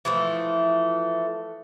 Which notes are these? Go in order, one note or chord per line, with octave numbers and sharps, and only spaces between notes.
E3 F3 A3